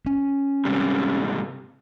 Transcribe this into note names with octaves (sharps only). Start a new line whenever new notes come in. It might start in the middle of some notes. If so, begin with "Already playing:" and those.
C#4
G#2 C3 G3